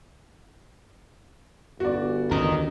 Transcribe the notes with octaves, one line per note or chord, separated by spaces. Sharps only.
G1 F#4 D5
D#2 D3 C#4 A#4 D#5